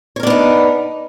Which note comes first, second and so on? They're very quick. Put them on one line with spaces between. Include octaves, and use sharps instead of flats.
C#5 A#4 D4 B3 D#4